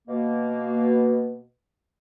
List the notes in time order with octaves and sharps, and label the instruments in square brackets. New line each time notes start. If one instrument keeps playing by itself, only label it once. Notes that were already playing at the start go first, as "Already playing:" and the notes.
[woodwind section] B2 A#3